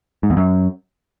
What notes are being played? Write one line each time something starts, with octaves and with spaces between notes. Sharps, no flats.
G#2
E2
F#2